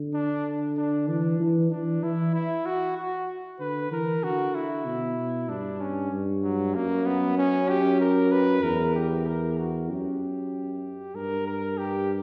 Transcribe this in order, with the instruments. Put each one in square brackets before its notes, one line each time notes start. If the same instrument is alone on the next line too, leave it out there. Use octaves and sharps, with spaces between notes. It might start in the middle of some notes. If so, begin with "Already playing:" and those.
Already playing: [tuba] D3
[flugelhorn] D4
D4
[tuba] E3 [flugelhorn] D4
[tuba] E3
[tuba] E3 [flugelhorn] D4
[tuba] E3 [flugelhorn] E4
[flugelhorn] E4
F#4
F#4
[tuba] D3 [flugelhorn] B4
[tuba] E3 [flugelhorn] A#4
[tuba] D3 [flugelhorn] F#4
[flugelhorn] E4
[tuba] B2
[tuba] G2 [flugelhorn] D4
[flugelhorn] C#4
[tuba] G2
[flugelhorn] F#3
[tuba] F#2 [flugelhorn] A#3
[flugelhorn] B3
C#4
G4
A#4
B4
[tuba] E2 [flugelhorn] A#4
[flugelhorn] G4
A#4
F#4
[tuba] F#2 [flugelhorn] G4
[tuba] G2 [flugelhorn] A#4
[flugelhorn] A#4
G4